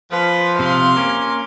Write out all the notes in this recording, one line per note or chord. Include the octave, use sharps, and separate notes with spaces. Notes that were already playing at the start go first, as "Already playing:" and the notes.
F3 B4
C3 F5 C6
A#3 C#4